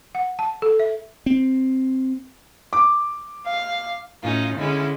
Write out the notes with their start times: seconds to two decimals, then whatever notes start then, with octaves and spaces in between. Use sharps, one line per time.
0.15 F#5
0.39 A5
0.62 A4
0.79 E5
1.26 C4
2.73 D6
3.47 F5
4.22 A2 C#4 D#4 F4
4.58 D3 G#3 C#4 E4